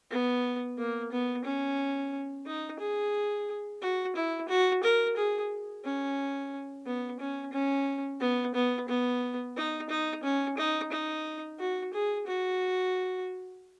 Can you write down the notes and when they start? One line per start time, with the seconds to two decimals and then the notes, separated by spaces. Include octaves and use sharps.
0.11 B3
0.78 A#3
1.12 B3
1.45 C#4
2.46 D#4
2.80 G#4
3.82 F#4
4.16 E4
4.49 F#4
4.83 A#4
5.16 G#4
5.85 C#4
6.86 B3
7.20 C#4
7.53 C#4
8.21 B3
8.55 B3
8.89 B3
9.57 D#4
9.90 D#4
10.23 C#4
10.58 D#4
10.92 D#4
11.59 F#4
11.94 G#4
12.27 F#4